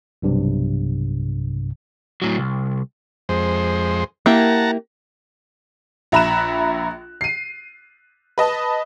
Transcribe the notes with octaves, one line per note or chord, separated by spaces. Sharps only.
B1 G2 C3
A2 F#3
C2
F2 G#3 C5
A#3 E4 G4 F#5 A5 A#5
A#1 E5 A#5 B5 F#6 E7
C7 D#7
B4 D#5 A5